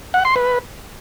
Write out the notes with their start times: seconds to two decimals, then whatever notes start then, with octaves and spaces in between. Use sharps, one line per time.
0.14 F#5
0.25 C6
0.36 B4